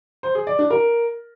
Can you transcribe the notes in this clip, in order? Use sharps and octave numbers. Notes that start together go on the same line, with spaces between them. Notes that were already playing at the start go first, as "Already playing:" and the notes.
C5
G#4
D5
D4
A#4